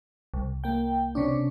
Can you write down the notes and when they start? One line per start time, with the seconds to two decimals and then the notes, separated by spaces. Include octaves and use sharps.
0.34 C2
0.64 A#3 G5
1.15 C3 C#4 D4